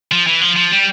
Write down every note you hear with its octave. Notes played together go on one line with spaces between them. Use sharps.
F3
E3
F3
F3
G3